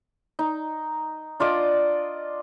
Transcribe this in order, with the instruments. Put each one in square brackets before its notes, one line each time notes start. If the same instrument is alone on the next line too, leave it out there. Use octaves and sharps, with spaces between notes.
[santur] D#4
D4 F4 D5 D#5